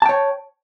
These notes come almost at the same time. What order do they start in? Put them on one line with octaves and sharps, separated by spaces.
A5 G5 C#5